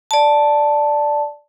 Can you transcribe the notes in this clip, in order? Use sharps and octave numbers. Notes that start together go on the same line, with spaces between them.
D5 A5